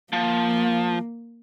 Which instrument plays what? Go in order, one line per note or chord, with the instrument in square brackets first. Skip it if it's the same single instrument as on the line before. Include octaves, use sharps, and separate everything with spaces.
[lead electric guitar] F3 [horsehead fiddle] A#3